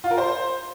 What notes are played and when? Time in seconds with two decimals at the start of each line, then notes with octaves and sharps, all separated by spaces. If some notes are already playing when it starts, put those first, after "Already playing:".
0.04 F4
0.11 A#4
0.18 C5